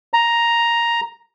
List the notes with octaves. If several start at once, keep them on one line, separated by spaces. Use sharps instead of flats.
A#5